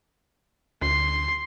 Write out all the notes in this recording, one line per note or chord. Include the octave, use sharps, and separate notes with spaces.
D2 C6